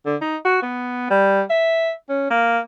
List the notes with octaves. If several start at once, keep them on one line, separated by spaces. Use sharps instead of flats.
D3
D#4
F#4
B3
G3
E5
C#4
A#3